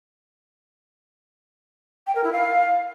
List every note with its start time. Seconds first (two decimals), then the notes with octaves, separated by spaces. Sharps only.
2.07 G5
2.15 A#4
2.24 E4
2.32 F5